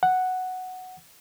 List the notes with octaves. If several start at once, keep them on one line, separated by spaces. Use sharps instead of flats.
F#5